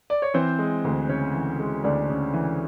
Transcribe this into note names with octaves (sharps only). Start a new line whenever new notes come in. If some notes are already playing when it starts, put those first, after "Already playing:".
D5
C#5
E3 C4 C5
G#3
D2
C#3 C#4 C#5
E3
G#3
D2 D4 D5
C#3
E3